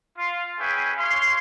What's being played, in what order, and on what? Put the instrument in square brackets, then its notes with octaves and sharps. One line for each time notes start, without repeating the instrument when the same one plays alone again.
[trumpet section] F4
C#4 G#4 B4 E5 G5
C#5 F5 C6